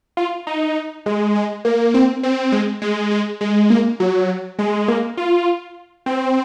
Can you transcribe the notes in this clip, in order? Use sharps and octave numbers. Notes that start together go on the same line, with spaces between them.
F4
D#4
G#3
G#3
A#3
C4
C4
G#3
G#3
G#3
G#3
A#3
F#3
G#3
A#3
F4
C4